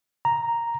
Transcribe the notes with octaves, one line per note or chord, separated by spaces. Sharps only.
A#5